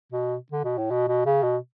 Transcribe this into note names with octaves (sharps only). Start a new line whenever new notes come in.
B2
D3
B2
A2
B2
B2
C#3
B2